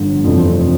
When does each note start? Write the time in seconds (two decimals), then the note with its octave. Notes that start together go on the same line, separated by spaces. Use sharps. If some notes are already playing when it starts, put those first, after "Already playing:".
Already playing: G1 G2 D3 F3
0.24 F1 F2 E3 A3 C4